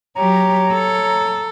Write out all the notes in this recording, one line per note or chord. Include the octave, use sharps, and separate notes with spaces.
F#3 G4 C#5 A#5
A4